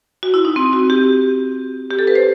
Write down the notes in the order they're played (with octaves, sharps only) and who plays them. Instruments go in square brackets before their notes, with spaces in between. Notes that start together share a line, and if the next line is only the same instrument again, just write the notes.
[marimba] F#4
E4
D#4
C4
F#4
G4
G4
A4
B4
C5